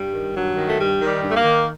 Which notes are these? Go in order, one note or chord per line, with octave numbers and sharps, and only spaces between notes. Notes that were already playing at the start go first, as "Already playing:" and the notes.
Already playing: G2 G3
D#3
G2 F#3
D#3
A3
G2 G3
D#3
G3
G2
A3
A#3
D#3